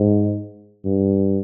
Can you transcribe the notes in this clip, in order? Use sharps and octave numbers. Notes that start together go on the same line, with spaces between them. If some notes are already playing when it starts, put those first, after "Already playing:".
Already playing: G#2
G2